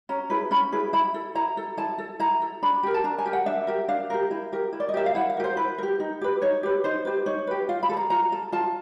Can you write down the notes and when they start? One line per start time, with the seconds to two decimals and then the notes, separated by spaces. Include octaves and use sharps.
0.09 C#4 A#5
0.30 E4 G#4 B4
0.51 C#4 B5
0.72 E4 G#4 B4
0.93 E4 B5
1.14 A4
1.35 E4 A#5
1.57 A4
1.77 E4 A5
1.98 A4
2.20 E4 A#5
2.42 A4
2.62 D4 B5
2.83 G4 A#4
2.94 A5
3.04 D4 A#5
3.18 G#5
3.26 G4 A#4
3.33 F#5
3.46 D4 E5
3.67 G4 A#4
3.88 D4 F5
4.10 G4 A#4
4.31 E4
4.52 G4 A#4
4.73 E4
4.80 D5
4.89 D#5
4.94 G4 A#4 E5
5.06 F5
5.15 E4 F#5
5.30 F5
5.37 G4 A#4
5.44 C5
5.57 E4 B4
5.78 A#4
5.83 G4
6.00 D#4
6.21 G4 B4
6.42 D#4 C#5
6.63 G4 B4
6.84 D#4 C5
7.05 G4 B4
7.26 D#4 C#5
7.47 G4 B4
7.69 F4 F5
7.83 B5
7.89 A4
7.97 A#5
8.10 F4 A#5
8.32 A4
8.52 F4 A5